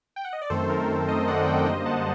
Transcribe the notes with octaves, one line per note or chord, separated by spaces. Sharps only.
G5
F#5
D#5
D5
F#2 D#3 A3 C4 A4 C5
A#4
A#4
C5 D#5
D5 F#5
D#5 G5
F#2 D3 G3 A#3 C5 D#5
F#5 A5